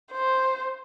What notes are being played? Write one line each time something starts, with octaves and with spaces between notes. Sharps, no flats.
C5